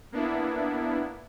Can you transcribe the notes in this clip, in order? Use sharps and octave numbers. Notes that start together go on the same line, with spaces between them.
A#3 B3 D4 E4